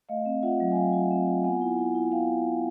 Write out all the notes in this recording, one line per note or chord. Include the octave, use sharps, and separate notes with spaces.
A3 D#5 F5
C4
F4 E5 F#5
F#3
G#5
F#3 F5 G5
F4
C4
F4
B3 F#5 G#5
E4
E4
E4
B3 F5 G5